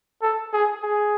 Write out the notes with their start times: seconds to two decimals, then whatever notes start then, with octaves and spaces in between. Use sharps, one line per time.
0.22 A4
0.53 G#4
0.83 G#4